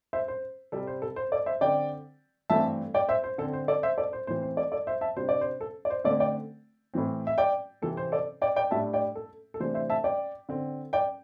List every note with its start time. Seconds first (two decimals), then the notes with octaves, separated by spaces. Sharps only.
0.13 C5 E5
0.28 C5
0.72 C3 G3 C4 A4
0.87 C5
1.02 A4
1.16 C5
1.32 A4 D5
1.46 C5 E5
1.61 D3 C4 D5 G5
2.50 G2 E3 A3 C4 E5 A5
2.94 D5 G5
3.08 C5 E5
3.24 C5
3.38 D3 A4
3.41 C4
3.53 C5
3.68 A4 D5
3.83 C5 E5
3.98 A4 D5
4.13 C5
4.27 A2 E3 C4 C5
4.42 C5
4.57 A4 D5
4.72 A4 D5
4.87 C5 E5
5.01 E5 A5
5.16 C3 G3 D4 C5
5.29 D5
5.41 C5
5.61 A4
5.85 D5
5.90 C5
6.04 D3 A3 C4 A4 D5
6.20 D5 G5
6.94 A2 E3 C4
7.27 E5
7.38 D5 G5
7.82 C3 E3 C4 A4
7.97 C5
8.12 A4 D5
8.42 D5 G5
8.56 D5 G5
8.71 A2 G3 D4 E5 A5
8.93 D5 G5
9.16 A4
9.54 A4
9.60 C3 E3 A3 D4 C5
9.74 C5 E5
9.90 E5 A5
10.04 D5 G5
10.49 D3 C4
10.93 D5 G5